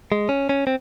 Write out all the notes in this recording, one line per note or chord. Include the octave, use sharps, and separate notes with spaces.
G#3
C#4
C#4
C4